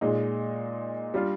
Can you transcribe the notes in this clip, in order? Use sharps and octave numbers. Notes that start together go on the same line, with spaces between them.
A#2 G#3 D#4
G3 D4 F4